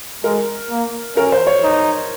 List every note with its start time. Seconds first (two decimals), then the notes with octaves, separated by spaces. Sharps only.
0.24 G#3 A#4
0.70 A#3
1.17 C#4 A#4
1.32 C5
1.47 C#5
1.63 D#4